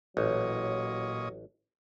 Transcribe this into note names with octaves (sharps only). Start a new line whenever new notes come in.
A1 A#2 F#3 C#5 D#5